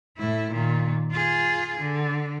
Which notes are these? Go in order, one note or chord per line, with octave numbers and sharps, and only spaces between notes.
A2 E4
A#2 D#3
F4 G#4
D3